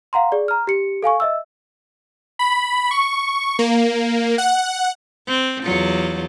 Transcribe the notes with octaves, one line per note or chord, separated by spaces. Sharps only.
F5 F#5 A#5 C6
G#4 D5
A#5 F6
G4 C#7
A4 F5 G#5 C#6
D#5 E5 E6
B5
C#6
A#3
F#5
C4
E2 F#3 F4